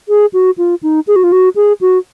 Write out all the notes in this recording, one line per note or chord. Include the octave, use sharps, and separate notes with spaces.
G#4
F#4
F4
D#4
G#4
F#4
F4
F#4
G#4
F#4